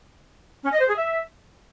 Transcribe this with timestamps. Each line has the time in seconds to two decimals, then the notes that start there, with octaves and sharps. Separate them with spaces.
0.63 C#4
0.72 D#5
0.80 C5
0.88 G#4
0.96 E5